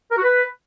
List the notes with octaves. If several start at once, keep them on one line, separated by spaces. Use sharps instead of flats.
A#4
F#4
B4